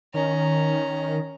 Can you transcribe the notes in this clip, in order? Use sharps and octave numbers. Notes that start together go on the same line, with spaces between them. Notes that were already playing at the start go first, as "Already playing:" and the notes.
D#3 C#4 A#5